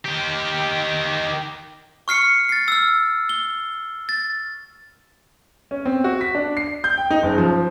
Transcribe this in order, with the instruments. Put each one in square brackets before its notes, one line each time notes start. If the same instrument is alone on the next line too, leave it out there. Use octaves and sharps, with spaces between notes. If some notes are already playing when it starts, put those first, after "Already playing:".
[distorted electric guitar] D#3 G4
[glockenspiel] C#6 F6 C7 C#7
A6 C7
E6 F6
G7
A6
[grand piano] C#4
C4
F#4
B6
D4
C7
G6
G5
D#4
F#1
F3